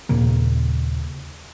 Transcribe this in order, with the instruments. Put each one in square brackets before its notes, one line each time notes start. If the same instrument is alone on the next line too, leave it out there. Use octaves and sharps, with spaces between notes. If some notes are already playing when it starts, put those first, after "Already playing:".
[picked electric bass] D#2 A#2 C#3 A#3